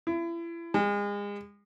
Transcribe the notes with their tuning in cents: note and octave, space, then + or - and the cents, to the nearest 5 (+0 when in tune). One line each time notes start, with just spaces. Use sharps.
E4 +35
G#3 -35